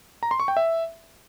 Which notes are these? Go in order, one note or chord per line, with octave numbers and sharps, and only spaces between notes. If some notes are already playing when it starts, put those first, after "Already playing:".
A#5
C6
C#6
G5
E5